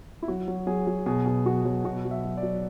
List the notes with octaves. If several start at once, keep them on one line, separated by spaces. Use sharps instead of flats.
E4
F#3 F#4
F#3
F#3 G#4
F#3
B2 G#4
B2
F#3 F#4
F#3
B2 F#4
F#3
E5
F#3
D5
F#3